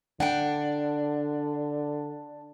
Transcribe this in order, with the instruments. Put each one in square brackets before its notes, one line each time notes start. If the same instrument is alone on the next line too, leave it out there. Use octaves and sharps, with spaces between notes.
[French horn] D3 [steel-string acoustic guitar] D4 [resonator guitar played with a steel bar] F#5 G5